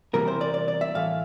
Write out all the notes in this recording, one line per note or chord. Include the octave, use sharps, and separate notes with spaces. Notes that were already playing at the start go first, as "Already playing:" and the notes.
E2 C3 E3 G3 A#3 A#4
C5
D5
D5
D5
E5
A2 E3 A3 F5